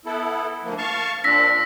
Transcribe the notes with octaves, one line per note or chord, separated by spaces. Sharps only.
B3 E4 A4
D2 F3 A#3
F5 A5 C#6
A#2 C4 D4 E6 A#6 B6